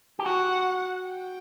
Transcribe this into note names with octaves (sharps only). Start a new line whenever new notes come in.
G4
F#4 F#5
G5